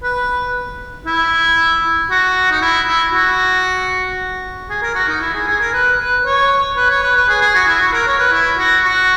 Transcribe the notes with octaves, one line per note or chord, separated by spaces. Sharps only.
B4
E4
F#4
D#4
E4
E4
F#4
G#4
A#4
F#4
D#4
E4
G#4
G#4
A#4
B4
B4
C#5
B4
C#5
B4
B4
G#4
G#4
F#4
E4
F#4
A#4
C#5
B4
E4
F#4
F#4